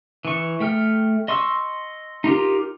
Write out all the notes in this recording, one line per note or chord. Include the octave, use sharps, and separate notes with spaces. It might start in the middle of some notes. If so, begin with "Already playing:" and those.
E3 C#6
A3 G5 F6
D#5 C6 C#6 E6
D#4 F4 G4 A#4